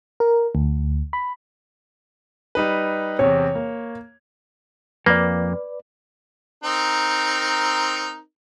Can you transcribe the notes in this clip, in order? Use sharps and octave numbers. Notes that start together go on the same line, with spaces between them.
A#4
D2
B5
G3 D#4 B4
E2 C3 C#5
A#3
F2 A#3 B4 D5
C4 D#4 A#4